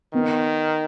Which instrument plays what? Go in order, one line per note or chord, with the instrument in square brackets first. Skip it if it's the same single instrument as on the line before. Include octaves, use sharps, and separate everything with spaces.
[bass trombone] D#3 [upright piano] B3